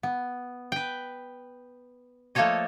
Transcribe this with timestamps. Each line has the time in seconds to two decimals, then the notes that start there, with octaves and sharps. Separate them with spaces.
0.03 B3
0.72 B4 G5
2.35 F3 A3 A#3 A4 C#5 D#5